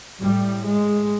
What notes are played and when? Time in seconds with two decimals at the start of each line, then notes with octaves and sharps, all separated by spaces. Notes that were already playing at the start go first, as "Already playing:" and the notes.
0.19 A2 G3
0.65 G#3